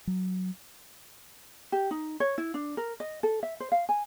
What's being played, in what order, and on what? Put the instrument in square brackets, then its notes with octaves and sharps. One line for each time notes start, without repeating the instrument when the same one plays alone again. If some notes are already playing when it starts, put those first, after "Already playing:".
[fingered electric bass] F#3
[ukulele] G4
D#4
C#5
E4
D4
A#4
D#5
A4
E5
C5
F5
G#5